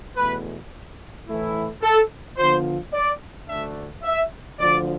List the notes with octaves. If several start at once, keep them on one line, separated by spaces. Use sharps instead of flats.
E2 B2 A3 B4
A2 E3 A3 E4
A4
D3 F3 B3 F4 C5
D5
D2 D3 A3 D4 E5
E5
D2 D3 F3 D5